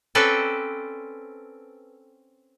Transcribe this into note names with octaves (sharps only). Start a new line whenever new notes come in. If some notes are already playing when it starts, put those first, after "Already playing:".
C4 C#4 A4 B4 D5 G5